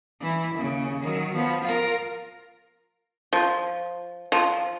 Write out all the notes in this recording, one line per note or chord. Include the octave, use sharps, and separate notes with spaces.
E3 E4
D#2 C#3
D#3 F#3
F3 B3
F4 A#4
F3
F3